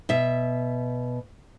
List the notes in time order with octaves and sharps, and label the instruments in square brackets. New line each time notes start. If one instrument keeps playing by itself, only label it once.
[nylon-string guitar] B2 E5